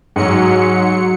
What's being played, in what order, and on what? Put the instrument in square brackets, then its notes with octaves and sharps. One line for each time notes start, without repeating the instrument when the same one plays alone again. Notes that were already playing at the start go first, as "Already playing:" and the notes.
[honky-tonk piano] G#2 [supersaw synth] F#3 C#7